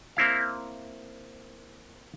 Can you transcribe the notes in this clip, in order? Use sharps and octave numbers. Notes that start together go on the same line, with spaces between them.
A#3 C4 E4 F5